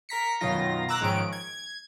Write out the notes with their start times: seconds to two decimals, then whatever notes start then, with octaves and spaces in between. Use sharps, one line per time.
0.09 A#4 A#5 B6 C#7
0.41 F#2 B2 D#3 F#3 F4 A#6
0.89 A#5 D6 E6 F#6
1.01 G#2 D#3 F3 C#4 D7
1.32 G#6